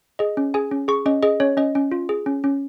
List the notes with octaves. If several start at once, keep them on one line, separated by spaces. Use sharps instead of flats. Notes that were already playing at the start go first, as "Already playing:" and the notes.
G#4 D#5
C#4
G#4 G#5
C#4
G#4 C#6
C#4 D#5
G#4 D#5
C#4 C#5
C#4 D#5
C#4
F4
G#4
C#4
C#4